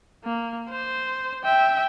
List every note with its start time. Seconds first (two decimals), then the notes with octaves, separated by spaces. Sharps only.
0.24 A#3
0.70 C5
1.44 E5 G5